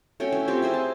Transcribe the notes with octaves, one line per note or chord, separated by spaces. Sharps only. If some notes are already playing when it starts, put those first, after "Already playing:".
A3 C#4 F#4 G5
E4
C4 E4 F4 G4
E4 G#4 C5
A5